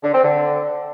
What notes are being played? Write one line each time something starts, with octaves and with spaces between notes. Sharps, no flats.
D3
C4
D3